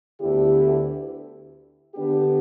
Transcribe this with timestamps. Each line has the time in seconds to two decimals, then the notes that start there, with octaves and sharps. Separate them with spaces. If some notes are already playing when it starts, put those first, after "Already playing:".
0.21 D2 D3 B3 E4 G4
1.95 D3 B3 D4 G4